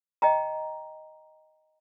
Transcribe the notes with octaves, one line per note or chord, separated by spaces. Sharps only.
D#5 G5 A#5